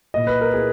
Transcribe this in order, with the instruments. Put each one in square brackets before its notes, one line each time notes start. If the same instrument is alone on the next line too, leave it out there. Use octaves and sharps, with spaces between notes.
[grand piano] A#2 A#3 E4 D#5
B4
A#4
A#3 E4 G#4